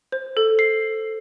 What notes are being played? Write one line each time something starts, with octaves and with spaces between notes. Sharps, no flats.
C5
A4
C7